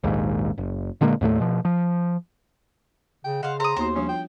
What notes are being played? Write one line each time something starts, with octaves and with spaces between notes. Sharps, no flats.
A#1 D#2 G#2
F#1
A#2 D3 G#3 A#3
D#2 A2 G3 A3
B2 F3
F3
C#3 G5
C#3 C5 D#5 F5 F#5
G#4 C5 A#5 D#6
D#2 B3 D#4 F#4 C5
F3 G3 C#4 D4
F4 G5